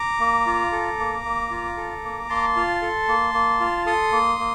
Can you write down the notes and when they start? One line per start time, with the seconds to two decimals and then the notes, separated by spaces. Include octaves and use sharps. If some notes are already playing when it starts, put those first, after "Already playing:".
Already playing: A#5 D6
0.20 A#3
0.47 F4
0.72 A4
0.99 A#3
1.25 A#3
1.51 F4
1.77 A4
2.04 A#3
2.29 A#3 A5 C6
2.56 F4
2.82 A4
3.08 A#3
3.34 A#3
3.60 F4
3.86 A4 C6 D#6
4.12 A#3
4.39 A#3